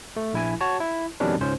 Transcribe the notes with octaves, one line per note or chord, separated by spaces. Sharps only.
A3
A#1 E4 G#5
F#4 C#5 A5
E4
F2 B2 D#3 G3 C#4 D4
C#2 G#2 C#4 C5